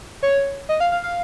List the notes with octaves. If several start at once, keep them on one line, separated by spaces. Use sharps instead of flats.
C#5
D#5
F5
F5
F5